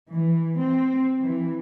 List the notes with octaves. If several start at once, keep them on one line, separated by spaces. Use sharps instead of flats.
E3
C4
E3